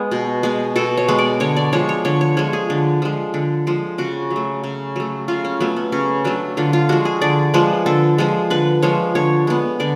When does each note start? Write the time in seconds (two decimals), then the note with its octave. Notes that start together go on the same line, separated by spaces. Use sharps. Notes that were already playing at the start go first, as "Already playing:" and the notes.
Already playing: G#3 B3
0.12 B2
0.43 G#3 B3
0.76 B2 A4
0.97 C#5
1.08 G#3 B3
1.18 D5
1.40 D3 C#5
1.56 D5
1.73 F3 G#3 C#5
1.89 C#5
2.05 D3 C#5
2.21 C#5
2.37 F3 G#3 C#5
2.53 G#4
2.70 D3
3.02 F3 G#3
3.34 D3
3.67 F3 G#3
3.98 C#3 F#4
4.31 F#3
4.36 A3
4.64 C#3
4.96 F#3 A3
5.28 C#3 F4
5.45 C#4
5.60 F#3 A3 B3
5.76 B3
5.92 C#3 C#4
6.24 F#3 A3 D4
6.57 D3 F4
6.73 F4
6.89 F3 G#3 F#4
7.05 G#4
7.21 D3 D5
7.54 F3 G#3 B4
7.86 D3 A4
8.18 F3 G#3
8.50 D3 B4
8.82 F3 G#3 C#5
9.15 D3 C#5
9.47 G#3 B3
9.80 D3 D5